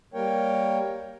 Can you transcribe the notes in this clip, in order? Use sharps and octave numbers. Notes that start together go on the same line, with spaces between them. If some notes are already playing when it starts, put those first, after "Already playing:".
G3 A#3 A#4 C#5 G5